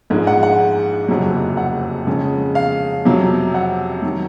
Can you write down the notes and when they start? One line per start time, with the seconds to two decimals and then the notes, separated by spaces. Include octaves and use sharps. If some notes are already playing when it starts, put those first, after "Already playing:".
0.10 A#1 G#2 F3 G#3
0.27 F#5
0.43 F#5
1.08 F#1 F2 C3 F#3
1.57 F#5
2.07 F2 C#3 G#3
2.55 F5
3.05 F2 C3 F#3
3.54 F#5
4.03 D#3 F#3